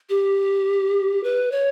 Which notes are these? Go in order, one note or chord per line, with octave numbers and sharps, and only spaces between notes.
G4
B4
C#5